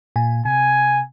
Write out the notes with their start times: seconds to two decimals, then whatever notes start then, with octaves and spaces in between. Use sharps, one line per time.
0.16 A#2 G#5
0.45 C3 G#5